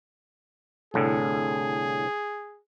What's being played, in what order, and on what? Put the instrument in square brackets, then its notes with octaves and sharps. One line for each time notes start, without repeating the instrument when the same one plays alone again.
[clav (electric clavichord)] C2 A2 D3 [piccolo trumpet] G#4